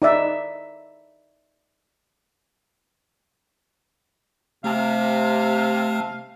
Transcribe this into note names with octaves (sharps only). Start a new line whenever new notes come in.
D#4 D5 E5
C3 A3 F5 A5